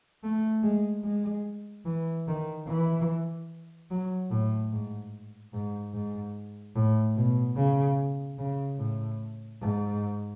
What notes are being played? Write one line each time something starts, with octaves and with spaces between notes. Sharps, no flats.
A3
G#3
G#3
E3
D#3
E3
F#3
A2
G#2
G#2
G#2
A2
B2
C#3
C#3
A2
G#2